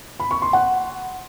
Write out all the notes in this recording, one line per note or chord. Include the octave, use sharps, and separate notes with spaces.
B5
C#6
C6
F#5